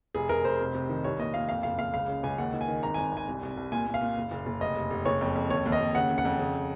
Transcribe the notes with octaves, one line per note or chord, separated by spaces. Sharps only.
F1 G#4
F1 A#4
F1 C5
C3
C3
D#3
C2 C#5
A#2 D#5
A#2 F5
F2 F5
F#1 F5
F#1 F5
C#2 F5
C#3
C#2 G#5
D#2 F#5
D#3
G#5
D#3
G#1 A#5
G#1 G#5
G#1 G#5
C2
C2
C2
A#2 G#5
A#2
F5
A#2
F#1
F#1
F#1
F1 D#5
F1
F1
F#1 C#5
F2
F2
D#2 C#5
D#2
D#5
D#2
C#3 F#5
C#3
F#5
F2
C#3